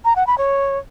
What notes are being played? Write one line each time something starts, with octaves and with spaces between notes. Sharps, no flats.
A#5
F#5
B5
C#5